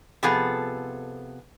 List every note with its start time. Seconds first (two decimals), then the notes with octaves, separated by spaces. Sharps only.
0.23 C3 F3 B3 G#4 A4